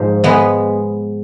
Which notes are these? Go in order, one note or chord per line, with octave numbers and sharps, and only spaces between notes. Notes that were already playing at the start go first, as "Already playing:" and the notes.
Already playing: G#2 F3
G#3 B3